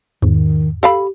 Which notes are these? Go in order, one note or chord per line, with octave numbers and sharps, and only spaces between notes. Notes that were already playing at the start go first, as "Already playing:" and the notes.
E2 G#2 D#3
G4 A4 F5 B5